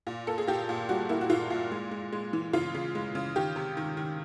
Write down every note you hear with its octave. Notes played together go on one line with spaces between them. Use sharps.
A#2
A#3 A4
G#4
A#2 G4
A#2
G3 F#4
A#3 E4
F#4
A#2 F4
A#2
G#3
G#3
G#3
E3
C#3 F4
C#3
G#3
C#3
D#3 G4
C3
D#3
D#3